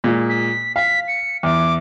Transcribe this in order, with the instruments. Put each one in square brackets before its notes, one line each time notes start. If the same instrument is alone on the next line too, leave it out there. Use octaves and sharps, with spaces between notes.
[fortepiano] A#2 G#3
[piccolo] B6
[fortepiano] F5 [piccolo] B6
[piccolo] C#7
[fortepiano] E2 [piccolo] D6